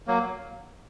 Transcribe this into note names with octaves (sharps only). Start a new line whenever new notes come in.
F#3 A#3